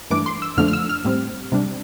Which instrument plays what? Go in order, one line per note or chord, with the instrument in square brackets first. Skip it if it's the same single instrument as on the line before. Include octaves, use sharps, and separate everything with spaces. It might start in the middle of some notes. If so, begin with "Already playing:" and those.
[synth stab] G2 E3 A3 D4 D6
C6
E6
F2 D3 F3 A3 D4 F6
F6
E6
F6
A2 G3 C4
C3 G3 D4